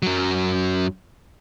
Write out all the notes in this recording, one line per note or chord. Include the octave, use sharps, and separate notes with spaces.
F#2 F#3